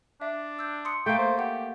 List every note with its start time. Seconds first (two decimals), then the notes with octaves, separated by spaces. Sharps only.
0.22 D4 E5
0.59 E6 G6
0.85 C6 D#6 C#7
1.06 A3 A#3 G5
1.18 C5
1.38 G4 F#5 G6